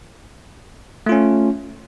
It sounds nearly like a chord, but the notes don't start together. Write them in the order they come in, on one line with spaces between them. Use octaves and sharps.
A3 F4 C#4